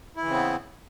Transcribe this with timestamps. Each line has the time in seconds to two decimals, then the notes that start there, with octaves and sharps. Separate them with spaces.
0.17 E4
0.21 E3
0.25 C#3
0.30 C4
0.34 B3